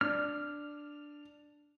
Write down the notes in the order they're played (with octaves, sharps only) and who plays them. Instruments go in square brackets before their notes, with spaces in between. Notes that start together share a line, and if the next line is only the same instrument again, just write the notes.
[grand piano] D4 [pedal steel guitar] F6